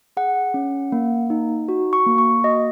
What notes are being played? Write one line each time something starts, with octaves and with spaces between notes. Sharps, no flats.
G#4 F#5
C#4
A#3
D#4
F#4
C#6
A#3
C#6
F#4 D#5